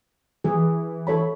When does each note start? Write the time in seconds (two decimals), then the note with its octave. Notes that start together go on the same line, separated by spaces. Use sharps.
0.44 E3 G#4
1.07 A4 C#5 B5